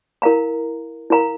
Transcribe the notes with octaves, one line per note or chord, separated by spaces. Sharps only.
E4 A#4 F5 A#5
E4 A#4 F5 A#5